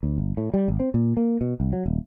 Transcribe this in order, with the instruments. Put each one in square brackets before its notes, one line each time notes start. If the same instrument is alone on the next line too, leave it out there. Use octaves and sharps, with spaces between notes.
[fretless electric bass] D2
G1
A2
G3
G#1
C4
A#2
A#3
B2
C2
F#3
D#1